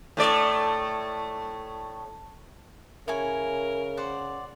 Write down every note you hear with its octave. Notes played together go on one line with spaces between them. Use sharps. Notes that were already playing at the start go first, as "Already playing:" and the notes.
A2 A3 D5
C#3 E4 A#4 C#5 G#5
C5 D5 F#5